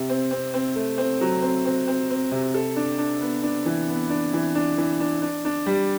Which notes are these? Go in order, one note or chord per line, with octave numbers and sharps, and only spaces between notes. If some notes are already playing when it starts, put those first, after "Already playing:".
Already playing: C3
C4
C4
C4
A3
C4
F#3
C4
C4
C4
C4
C3
A4
D4
D4
B3
D4
E3
B3
D4
E3
D4
E3
D4
D4
D4
G3